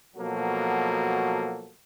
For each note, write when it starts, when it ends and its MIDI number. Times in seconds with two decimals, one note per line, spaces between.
0.16 1.71 47
0.16 1.71 53
0.16 1.71 54
0.16 1.71 58
0.16 1.71 66
0.16 1.71 69